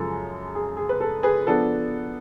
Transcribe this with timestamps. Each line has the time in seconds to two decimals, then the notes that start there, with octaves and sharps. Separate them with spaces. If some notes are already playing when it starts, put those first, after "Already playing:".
Already playing: F#2 C#3 F3 G#3 A4
0.55 G#4
0.77 G#4
0.89 B4
1.00 A4
1.23 G#4 B4
1.47 F3 B3 D4 A4